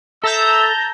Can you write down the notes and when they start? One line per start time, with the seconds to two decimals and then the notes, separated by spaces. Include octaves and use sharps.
0.24 A4 E5 A5 A#5 E6 G6